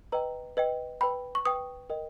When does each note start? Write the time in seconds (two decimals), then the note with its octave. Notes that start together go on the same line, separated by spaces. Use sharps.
0.12 B4 D#5 G5 A#5
0.57 B4 D#5 G5
1.01 B4 G5 B5
1.35 C#6
1.45 B4 G5 D#6
1.90 A#4 D#5 G5